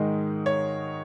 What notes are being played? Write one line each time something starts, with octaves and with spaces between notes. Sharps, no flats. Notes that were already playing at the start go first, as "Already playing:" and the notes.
Already playing: G#2 D#3 G#3 D#4 D#5
C#5